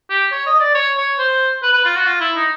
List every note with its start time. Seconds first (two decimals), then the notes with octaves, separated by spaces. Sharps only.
0.10 G4
0.32 C#5
0.46 D#5
0.60 D5
0.74 C#5
0.97 C#5
1.19 C5
1.63 B4
1.73 B4
1.85 F4
1.95 F#4
2.06 F4
2.21 E4
2.36 D#4